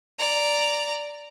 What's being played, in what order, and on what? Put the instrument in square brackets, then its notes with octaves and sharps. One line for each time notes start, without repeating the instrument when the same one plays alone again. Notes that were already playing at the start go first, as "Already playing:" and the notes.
[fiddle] D5 A#5